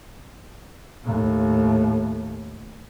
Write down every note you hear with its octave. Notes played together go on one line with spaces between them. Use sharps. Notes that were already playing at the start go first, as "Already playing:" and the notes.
D#2 A2